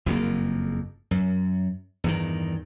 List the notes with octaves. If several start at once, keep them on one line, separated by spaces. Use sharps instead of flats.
F#1 F2 C3 A#3
F#2
E2 G2 D#3